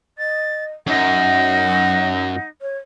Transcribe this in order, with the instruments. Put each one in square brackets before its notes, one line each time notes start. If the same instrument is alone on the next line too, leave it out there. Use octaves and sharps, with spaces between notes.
[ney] D#5 [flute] A6
[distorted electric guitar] F#2 [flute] D#4 [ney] F#5
[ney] C#5